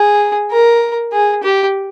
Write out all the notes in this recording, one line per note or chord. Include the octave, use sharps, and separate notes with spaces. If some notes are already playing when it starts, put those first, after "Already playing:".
Already playing: G#4
A#4
G#4
G4